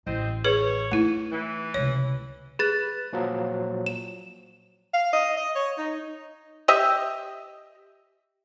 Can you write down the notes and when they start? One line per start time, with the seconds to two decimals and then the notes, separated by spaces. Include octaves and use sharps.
0.07 A1 C4 C5 D#5
0.44 G#4 B4 C#5
0.92 A3 D#4 E4
1.32 E3
1.74 C#2 C3 C#5
2.59 G#4 B4 A6
3.13 A#2 F3 F#3
3.86 E7
4.93 F5
5.13 D#5
5.37 D#5
5.55 C#5
5.78 D#4
6.68 G4 D#5 E5